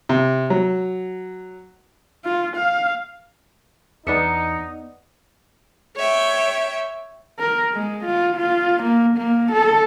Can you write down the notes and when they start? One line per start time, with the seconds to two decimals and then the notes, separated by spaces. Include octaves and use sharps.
0.09 C3
0.50 F#3
2.25 F4
2.56 F5
4.07 E2 B3 D4 D#4 E5 C#7
5.97 C#5 E5 G5
7.39 A#4
7.74 G#3
8.05 F4
8.36 F4
8.83 A#3
9.17 A#3
9.52 A4